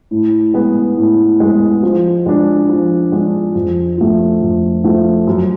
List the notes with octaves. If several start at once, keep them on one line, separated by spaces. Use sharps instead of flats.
A2
G#3 B3
A2
G#3 B3
F3
G#3 D4
F3
G#3 D4
F2
F3 A3
F2
F3 A3
F#2